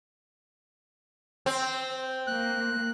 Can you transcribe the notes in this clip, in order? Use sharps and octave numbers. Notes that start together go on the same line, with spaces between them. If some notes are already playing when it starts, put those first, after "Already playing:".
C4
A#3 F#6